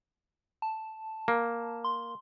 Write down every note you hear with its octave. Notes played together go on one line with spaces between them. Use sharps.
A5
A#3
C6